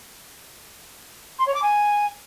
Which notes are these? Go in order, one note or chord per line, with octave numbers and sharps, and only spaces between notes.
C6
C#5
D6
G#5